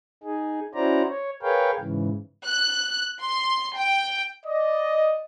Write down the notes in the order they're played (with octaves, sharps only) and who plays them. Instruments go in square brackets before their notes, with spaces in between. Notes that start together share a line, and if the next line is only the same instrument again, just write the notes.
[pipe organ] D#4 G#4
C#4 E4 F#4 C5 D5 A#5
C#5
G#4 A#4 B4 C#5 F5 G5
G#2 C#3 E3
[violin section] F#6
C6
G5
[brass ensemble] D5 D#5